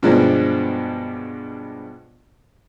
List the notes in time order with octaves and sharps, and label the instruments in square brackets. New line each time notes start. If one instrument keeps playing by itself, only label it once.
[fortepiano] G2 B2 F3 G#3 D4